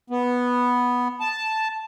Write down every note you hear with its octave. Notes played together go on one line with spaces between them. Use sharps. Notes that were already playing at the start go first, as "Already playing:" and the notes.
B3
A5